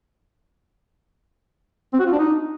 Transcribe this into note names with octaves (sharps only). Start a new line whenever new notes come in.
C4
F#4
F4
D4
D#4